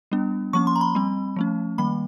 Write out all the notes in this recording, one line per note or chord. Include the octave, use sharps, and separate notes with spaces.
G3 B3 D4
F3 A#3 C#4 C#6
C6
A#5
B5
G3 C4
F3 A3 C#4
D#3 G3 A#3 B5